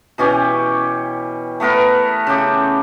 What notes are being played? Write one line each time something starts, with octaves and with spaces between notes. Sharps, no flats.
B2 E3 C#4 G4
A3 B3 A#4 B4
C#3 G4